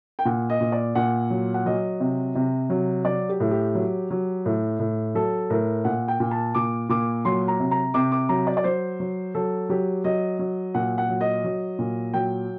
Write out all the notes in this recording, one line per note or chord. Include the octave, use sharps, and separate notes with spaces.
G5
A#2 F#5
D#5
A#2
D5
A#2 F#5
F#3
F#5
F#3 D#5
C3
C3
F#3
F#3 D5
G4
A2
G4
F#3
F#3
A2
A2
F#3 A4
A2 A#4
A#2 F#5
G5
A#2
A5
A#2 D6
A#2 D6
F#3 C6
A#5
C3
A#5
C3 D6
D6
F#3 A#5
D5
D5
F#3 C5
F#3
F#3 A4
F#3 G4
F#3 D#5
F#3
A#2 F#5
F#5
F#3
D#5
F#3
A#2
F#3 G5